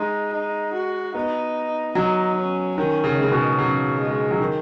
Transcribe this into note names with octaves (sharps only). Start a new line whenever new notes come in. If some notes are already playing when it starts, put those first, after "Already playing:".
Already playing: G#3 D#4
D#4
F#4
B3 D#4
F#3 D#4
C#4
D#3 C#4
C#3
C#3 G#3
B2
C#3 F#3
G#3
F#3
D#3